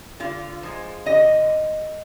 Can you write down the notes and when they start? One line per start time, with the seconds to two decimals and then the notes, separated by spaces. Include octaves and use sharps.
0.20 D3 F4
0.63 F3 G#3
1.06 D3 D#5